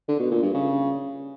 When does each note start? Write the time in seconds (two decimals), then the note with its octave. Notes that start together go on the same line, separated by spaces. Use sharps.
0.08 D3
0.20 B2
0.31 A#2
0.42 G2
0.54 C#3